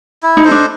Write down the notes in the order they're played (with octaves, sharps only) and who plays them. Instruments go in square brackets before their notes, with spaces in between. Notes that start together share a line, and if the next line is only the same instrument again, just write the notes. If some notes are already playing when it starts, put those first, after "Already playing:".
[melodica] E4
[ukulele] D#4
[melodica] A4 C5 D#5
[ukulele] D4